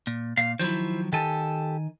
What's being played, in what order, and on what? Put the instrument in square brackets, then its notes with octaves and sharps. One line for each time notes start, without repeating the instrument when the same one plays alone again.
[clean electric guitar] A#2
[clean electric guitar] A#2 [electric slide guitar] F5
[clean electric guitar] D#3 F3 F#3 [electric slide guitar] E4 C5
[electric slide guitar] D#3 G#5 [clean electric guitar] G4 A4